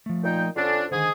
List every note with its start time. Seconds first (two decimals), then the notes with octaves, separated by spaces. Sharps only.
0.06 F3 A3
0.24 A#2 D#4 G5
0.56 D3 C#4 D4 F4 A4 C5
0.91 G#2 D3 D#3 G#4